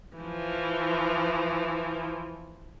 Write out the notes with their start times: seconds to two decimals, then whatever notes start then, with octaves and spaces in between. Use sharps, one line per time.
0.17 E3 F3